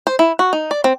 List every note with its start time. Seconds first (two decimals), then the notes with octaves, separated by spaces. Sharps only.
0.07 C5
0.19 E4
0.39 F#4
0.53 D#4
0.71 D5
0.84 C4